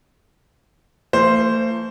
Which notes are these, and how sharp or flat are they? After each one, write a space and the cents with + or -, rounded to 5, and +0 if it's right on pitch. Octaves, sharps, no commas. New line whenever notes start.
F3 -45 A3 +45 C5 +0